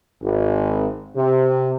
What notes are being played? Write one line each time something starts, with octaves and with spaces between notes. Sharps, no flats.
G#1
C3